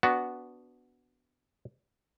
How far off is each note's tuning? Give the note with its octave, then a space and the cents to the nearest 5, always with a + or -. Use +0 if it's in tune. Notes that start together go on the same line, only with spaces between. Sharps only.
B3 +0 D4 -20 F#4 +0